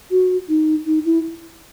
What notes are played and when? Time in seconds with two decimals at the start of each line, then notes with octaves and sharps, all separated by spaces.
0.11 F#4
0.49 D#4
0.86 D#4
1.05 E4